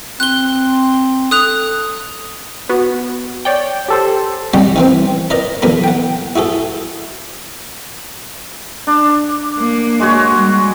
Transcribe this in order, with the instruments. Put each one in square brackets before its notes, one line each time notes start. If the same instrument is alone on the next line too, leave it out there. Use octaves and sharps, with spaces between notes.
[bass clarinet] C4 [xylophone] F#6 G7
[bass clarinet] A4 [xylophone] D#6 F#6 F7
[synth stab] B3 F#4
C#5 D5 G5
[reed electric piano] G4 A4 C5
[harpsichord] C2 G3 G#3 G4 F#5 C#6
D#3 E3 C4
A#4 B4 D5 D#5 A#5
B1 E2 D3 A#4 B5
F#5 G5
E4 F#4 G#4 A4
[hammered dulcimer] D4
[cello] A#3
[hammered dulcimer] G#3 F#4 C#5
[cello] G3